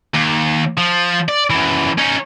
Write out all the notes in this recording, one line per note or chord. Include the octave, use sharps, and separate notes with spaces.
D#2
F3
D5
F#2 E3
C#4 D#4